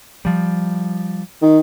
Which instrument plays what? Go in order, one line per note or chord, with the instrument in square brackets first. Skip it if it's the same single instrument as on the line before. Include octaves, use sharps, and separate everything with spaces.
[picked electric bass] F3 G3
[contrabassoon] D#3